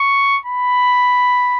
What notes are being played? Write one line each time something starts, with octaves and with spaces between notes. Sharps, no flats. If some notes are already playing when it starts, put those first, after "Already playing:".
Already playing: C#6
B5